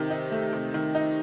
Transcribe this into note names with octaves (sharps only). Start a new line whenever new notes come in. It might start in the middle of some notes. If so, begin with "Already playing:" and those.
Already playing: C3 D#3
D#4
A3
C3
D#3
D#4